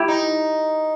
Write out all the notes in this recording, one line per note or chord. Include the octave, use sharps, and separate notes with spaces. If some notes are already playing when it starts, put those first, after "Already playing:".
Already playing: E4 G4
D#4